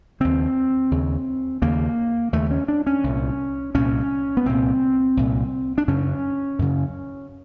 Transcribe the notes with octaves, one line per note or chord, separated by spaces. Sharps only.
D#2 C#3 C4
D#2 C#3
D#2 C#3 A#3
D#2 C#3 A3
C#4
D4
C#4
C2 A#2
C2 A#2 C#4
B3
C2 A#2 C4
C2 A#2
D4
F#2 C#3 C#4
F#2 C#3